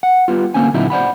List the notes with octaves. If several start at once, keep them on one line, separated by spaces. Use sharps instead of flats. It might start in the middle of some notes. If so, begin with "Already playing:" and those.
F#5
G3 B3 F4
D2 F#3 A#3 C4 C#4 G#5
A#2 D3 F#3 C4 D#4 E4
C5 D5 F#5 B5